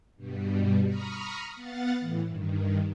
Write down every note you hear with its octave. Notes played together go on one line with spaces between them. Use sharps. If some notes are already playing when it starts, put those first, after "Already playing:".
G2 B2 G3
A#5 B5 C#6 D#6 F6
B3 F5 F#5 A6
A2 E3
G2 D#3